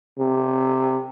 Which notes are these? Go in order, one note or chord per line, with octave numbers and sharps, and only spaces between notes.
C3